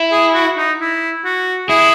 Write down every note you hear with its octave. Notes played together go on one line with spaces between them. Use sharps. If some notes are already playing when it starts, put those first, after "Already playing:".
Already playing: E4
G#4
F#4
D#4
E4
F#4
E4 G#4